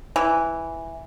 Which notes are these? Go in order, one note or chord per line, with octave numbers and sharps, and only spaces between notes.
E3